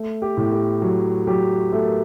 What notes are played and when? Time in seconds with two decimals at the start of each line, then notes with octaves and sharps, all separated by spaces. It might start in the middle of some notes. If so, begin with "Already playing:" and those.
Already playing: A3
0.22 G4
0.37 A2
0.52 G4
0.82 F#3
1.27 F#3 G4
1.73 A3 A4
1.83 A#4